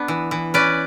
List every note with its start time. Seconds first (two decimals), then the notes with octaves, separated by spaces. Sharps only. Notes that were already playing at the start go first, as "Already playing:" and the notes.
Already playing: B3 D4
0.08 E3
0.31 E3
0.54 C#4 B4 D5